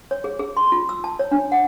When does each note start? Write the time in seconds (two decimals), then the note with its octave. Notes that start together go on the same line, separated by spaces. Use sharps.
0.11 C#5
0.24 G#4
0.39 G#4
0.57 C6
0.72 F4
0.89 E6
1.04 A5
1.19 C#5
1.31 D4
1.52 F#5